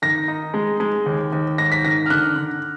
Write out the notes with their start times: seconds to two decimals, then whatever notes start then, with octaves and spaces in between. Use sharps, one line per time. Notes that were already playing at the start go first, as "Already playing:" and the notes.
0.02 D#3 A#6
0.28 D#4
0.54 G#3
0.80 G#3
1.06 D#2
1.32 D#2
1.58 G#2 A#6
1.72 B6
1.85 D#3 A#6
2.06 F6
2.10 D3 F#6
2.36 D3